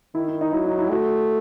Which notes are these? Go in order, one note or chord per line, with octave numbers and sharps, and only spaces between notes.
D#3 E4
E4
D#4
F#3 E4
D#4
E4
A3 F#4